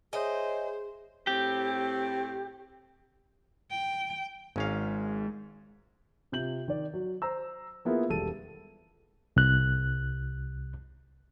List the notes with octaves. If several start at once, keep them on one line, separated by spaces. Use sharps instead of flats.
G#4 C5 C#5 D#5 E5 G#5
A2 C4 G4
G5
G#1 G#2 C#4 F5
C3 F4 G6 F#7
D#3 D5
F#3
C5 A#5 E6
A#3 B3 E4 F4 G#4 A#4
E1 G3 A4 D#7
C2 F#6